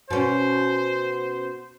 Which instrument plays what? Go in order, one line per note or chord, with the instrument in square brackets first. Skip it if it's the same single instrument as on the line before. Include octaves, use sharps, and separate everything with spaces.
[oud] B2 C#4 [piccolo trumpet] C5